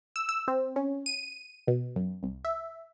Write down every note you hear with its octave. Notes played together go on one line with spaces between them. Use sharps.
E6
E6
C4
C#4
D#7
B2
F#2
C2
E5